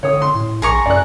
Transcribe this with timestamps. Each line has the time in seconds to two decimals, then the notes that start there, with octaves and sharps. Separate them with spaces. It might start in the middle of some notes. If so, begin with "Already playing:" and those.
0.03 D3 C#5 D#6
0.22 C6
0.35 A2
0.62 A#1 G#4 A#5 C#6
0.86 F#2 D5 F#6